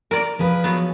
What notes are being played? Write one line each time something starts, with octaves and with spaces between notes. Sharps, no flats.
A#4 D5
F3 G#4 B4
F#3 B3